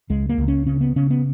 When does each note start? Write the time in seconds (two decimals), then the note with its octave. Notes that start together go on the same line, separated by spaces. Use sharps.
0.10 C#2 G#3
0.29 A#3
0.38 C#2
0.48 C#4
0.66 C#3 C#4
0.81 B3
0.96 C#3 C#4
1.10 B3